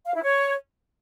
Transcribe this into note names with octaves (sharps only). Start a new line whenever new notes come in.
F5
E4
C#5